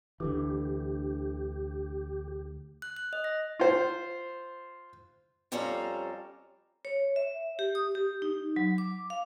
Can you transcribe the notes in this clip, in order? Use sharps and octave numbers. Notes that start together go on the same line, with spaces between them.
D2 D3 E3 G4
F#6
F#6
D#5
A#6
F4 C5
F2 G3 C#4 A4 F5 A#5
C#5
E5
G4
D#6
G4
D#4
F#3
D6
F5